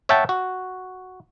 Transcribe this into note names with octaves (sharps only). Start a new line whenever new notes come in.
C#5 E5 F#5 G5 A5
F#4